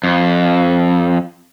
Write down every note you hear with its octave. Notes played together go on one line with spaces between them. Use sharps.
F2